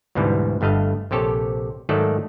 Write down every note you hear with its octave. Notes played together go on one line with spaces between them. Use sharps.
D2 G#2 B2 E3 G3
G1 G2 A3 D#5 F5
A#1 C3 G4 A4 C#5
G#2 D#3 F#3 A3 A4 D5